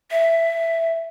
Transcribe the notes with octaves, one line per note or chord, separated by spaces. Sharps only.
E5